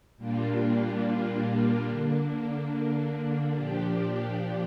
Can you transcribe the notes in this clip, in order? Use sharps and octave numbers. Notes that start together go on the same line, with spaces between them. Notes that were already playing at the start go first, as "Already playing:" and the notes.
A#2 G3 A#3 D4 F4
D3 A#3 D4
A#2 F3 D4 G4